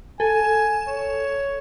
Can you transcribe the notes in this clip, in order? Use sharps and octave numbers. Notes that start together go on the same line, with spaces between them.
A4 G#5
C#5